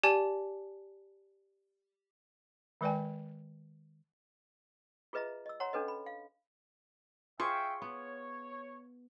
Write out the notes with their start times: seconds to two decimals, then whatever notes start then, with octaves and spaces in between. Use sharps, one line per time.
0.04 G4 D5 G#5 A5
2.81 D#3 G#3 B4 D5 G5 G#5
5.13 F4 G#4 B4 D#5 E5 A#5
5.46 D#5 E6
5.60 C#5 F#5 A#5 C6
5.73 C#4 D4 A4 B4 D#5
5.88 B5
6.06 F5
7.40 F4 G#4 C5 E5 G5 C#6
7.82 B3 C#5